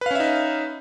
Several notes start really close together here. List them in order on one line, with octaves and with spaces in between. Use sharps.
B4 F5 C#4 E5 D#4